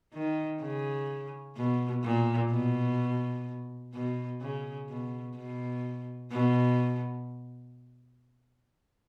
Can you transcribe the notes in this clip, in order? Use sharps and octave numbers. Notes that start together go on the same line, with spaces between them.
D#3
C#3
B2
A#2
B2
B2
C#3
B2
B2
B2